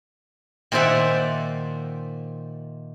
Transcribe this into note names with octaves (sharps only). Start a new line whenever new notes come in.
A#2 D#3 C5 D5 E5 F#5